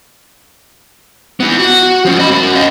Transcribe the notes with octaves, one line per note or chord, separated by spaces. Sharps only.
B3 E4
F#4
F3 C#4
D#5 B5
C#4 F#4
D#5 F5